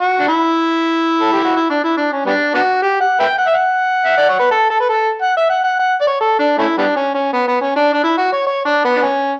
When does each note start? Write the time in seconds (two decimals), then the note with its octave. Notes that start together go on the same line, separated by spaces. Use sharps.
0.01 F#4
0.19 D4
0.28 E4
1.21 A4
1.32 G4
1.44 F#4
1.56 E4
1.70 D4
1.84 E4
1.97 D4
2.12 C#4
2.26 G3 B3 D4
2.54 B3 D4 F#4
2.82 G4
3.01 F#5
3.19 B4 E5 G5
3.38 F#5
3.47 E5
3.54 F#5
4.05 E5
4.17 D5
4.29 C#5
4.39 B4
4.51 A4
4.70 A4
4.80 B4
4.89 A4
5.22 F#5
5.37 E5
5.50 F#5
5.64 F#5
5.79 F#5
6.01 D5
6.07 C#5
6.21 A4
6.39 D4
6.58 A3 C#4 E4
6.78 G3 B3 D4
6.96 C#4
7.14 C#4
7.33 B3
7.48 B3
7.61 C#4
7.76 D4
7.93 D4
8.04 E4
8.18 F#4
8.32 C#5
8.47 C#5
8.65 D4
8.85 B3
8.96 D4
9.02 C#4